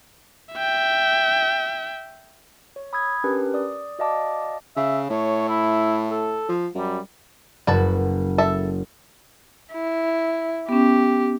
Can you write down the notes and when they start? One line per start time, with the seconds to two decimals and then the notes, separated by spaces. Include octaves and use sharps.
0.54 E5 G5
2.76 C#5
2.93 B5 D#6 E6 G#6
3.24 C#4 D4 G4 A#4 B4
3.54 D5 D#6
3.99 F#4 D5 D#5 F5 A5 D6
4.77 C#3 E5
5.10 A2 C#5
5.48 E4
6.10 A4
6.49 F3
6.75 F#2 G3
7.67 F#1 F#4 B4 A5
8.38 A4 E5
9.74 E4
10.69 B3 C#4 G4